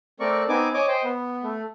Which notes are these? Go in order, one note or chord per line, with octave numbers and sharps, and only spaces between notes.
A3 C4 A#4 D5 C#6
B3 C4 D#4 G#5 D6
C#5 D#5 G#5 D6
C5 D#5 G5
B3
A3